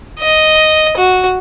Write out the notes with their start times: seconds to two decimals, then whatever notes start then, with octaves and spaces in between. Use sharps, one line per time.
0.20 D#5
0.97 F#4